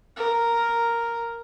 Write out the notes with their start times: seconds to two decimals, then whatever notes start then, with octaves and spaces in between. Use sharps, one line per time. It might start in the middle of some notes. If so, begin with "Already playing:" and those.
0.16 A#4